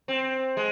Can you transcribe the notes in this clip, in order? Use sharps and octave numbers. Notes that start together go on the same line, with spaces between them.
C4
G#3